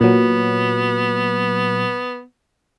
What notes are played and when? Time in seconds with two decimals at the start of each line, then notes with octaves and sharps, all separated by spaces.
0.01 A#2 F#3 B3